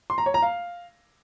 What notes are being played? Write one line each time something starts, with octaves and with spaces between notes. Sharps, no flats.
C6
A#5
C#5
A#5
F5